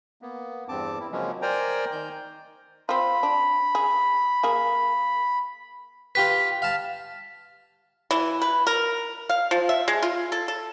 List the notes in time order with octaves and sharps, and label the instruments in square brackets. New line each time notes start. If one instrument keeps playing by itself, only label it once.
[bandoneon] A#3 B3
E2 G2 C4 A5 D6
E4
C#3 F3 F#3 G#3 A#3 C#4
A#4 C5 D5 G5 G#5 A#5
D#3 G6
[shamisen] C4 F4 [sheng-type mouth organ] B5
[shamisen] D4
G#4
A#3 G#4
[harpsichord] F4 G4 B4 [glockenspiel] B6
[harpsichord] F5 A5
[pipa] E3
B4
A#4
F5
F3
E5
G#3
F4
A4
A4